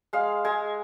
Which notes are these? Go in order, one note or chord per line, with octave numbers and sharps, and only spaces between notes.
G#3 F5
G#3 G#5